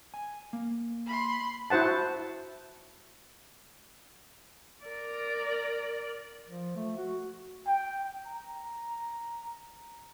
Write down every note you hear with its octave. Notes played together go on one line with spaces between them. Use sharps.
G#5
A#3
B5 C6
E4 F#4 C5 F#5 A5
A#4 D5
F3
A3
F#4
G5
A#5